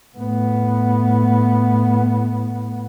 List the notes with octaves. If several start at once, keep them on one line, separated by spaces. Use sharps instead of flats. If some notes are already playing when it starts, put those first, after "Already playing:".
A2 B3